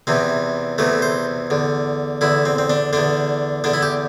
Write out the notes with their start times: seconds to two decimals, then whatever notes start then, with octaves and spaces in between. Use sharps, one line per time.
0.07 E2 C3 E3 C4
0.78 E2 C3 E3 A3
1.02 C5
1.50 E2 D3
2.21 E2 D3 E4
2.45 C4
2.58 C4
2.70 D4
2.93 E2 D3 D4
3.64 E2 D3 D4
3.74 E4
3.82 G4